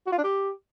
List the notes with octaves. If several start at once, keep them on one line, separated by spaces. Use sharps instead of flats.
F#4
F4
D4
G4